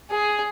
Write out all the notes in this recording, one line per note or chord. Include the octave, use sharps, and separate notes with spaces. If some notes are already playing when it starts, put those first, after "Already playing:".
G#4